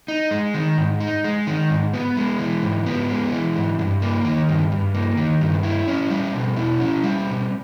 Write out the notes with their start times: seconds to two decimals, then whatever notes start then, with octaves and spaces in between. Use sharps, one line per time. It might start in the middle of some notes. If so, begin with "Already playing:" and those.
0.08 D#4
0.31 G#3
0.54 D#3
0.78 G#2
1.00 D#4
1.24 G#3
1.47 D#3
1.70 G#2
1.94 B3
2.17 G#3
2.39 E3
2.63 G#2
2.86 B3
3.09 G#3
3.32 E3
3.56 G#2
3.79 G2
4.02 A#3
4.25 D#3
4.49 G2
4.72 G2
4.94 A#3
5.17 D#3
5.41 G2
5.63 E4
5.88 C#4
6.10 G3
6.33 B2
6.57 E4
6.80 C#4
7.03 G3
7.26 B2